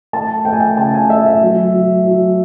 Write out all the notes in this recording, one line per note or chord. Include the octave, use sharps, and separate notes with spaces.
A3 A5
A3 G5
G#5
G5
C#3 A5
G#5
A3 E5
E5
F#3
F#3
F#3